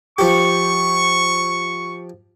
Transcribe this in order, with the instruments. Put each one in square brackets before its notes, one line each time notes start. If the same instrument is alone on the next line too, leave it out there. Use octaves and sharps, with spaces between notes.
[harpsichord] F3 G4 [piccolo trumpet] C#6